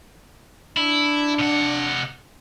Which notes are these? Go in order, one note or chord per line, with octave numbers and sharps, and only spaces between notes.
D4 E4
C3 F#5